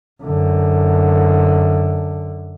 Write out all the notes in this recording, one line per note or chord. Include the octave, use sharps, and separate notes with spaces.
F#2 D3